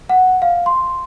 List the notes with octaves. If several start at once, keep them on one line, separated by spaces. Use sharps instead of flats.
F#5
F5
C6